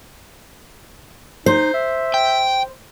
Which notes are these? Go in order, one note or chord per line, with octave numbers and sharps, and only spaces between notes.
D#4 C5
E5
G5